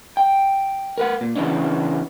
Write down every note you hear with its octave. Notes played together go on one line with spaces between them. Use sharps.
G5
A#4 B4 F#5
A#2
C#3 E3 B3 C#4 D4